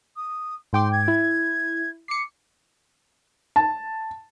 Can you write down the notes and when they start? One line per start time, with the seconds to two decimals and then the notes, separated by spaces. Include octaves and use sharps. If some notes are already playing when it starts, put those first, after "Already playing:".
0.16 D#6
0.73 G#2 G5 C6 D6
0.92 G#6
1.08 E4
2.08 D6 C7 C#7
3.56 A5